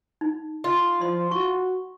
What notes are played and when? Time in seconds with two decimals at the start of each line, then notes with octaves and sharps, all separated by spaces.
0.21 D#4
0.64 F4
1.01 F3 D5 C6
1.31 F#4 C#6